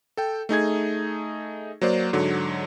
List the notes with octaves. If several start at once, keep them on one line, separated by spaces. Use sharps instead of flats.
A4 G5
A3 D#4 G#4 G#6
F#3 A#3 C5 D5
G#2 D3 F#3